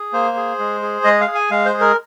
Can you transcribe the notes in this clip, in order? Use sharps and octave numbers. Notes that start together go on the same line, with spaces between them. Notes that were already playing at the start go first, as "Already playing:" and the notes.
Already playing: G#4
A#3 C5
G#4
G#3
G#4
G#3 D#5
F5
G#4
G#5
G#3 F5
C5
G#4
A#4